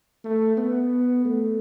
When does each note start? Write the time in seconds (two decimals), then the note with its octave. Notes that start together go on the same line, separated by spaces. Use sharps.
0.24 A3
0.57 B3
1.25 A3